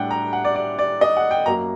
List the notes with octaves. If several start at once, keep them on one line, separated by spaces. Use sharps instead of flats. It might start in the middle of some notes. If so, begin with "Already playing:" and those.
Already playing: A2 G3 D4 F#5 G5
A#5
F#5
D5
D5
D5
D#5
F#5
G5
F#2 F#3 A#3 A#5